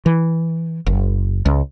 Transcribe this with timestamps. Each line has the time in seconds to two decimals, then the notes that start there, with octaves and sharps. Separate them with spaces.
0.06 E3
0.86 F#1
1.46 C#2